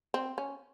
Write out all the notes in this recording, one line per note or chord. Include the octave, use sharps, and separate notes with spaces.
C4
C#4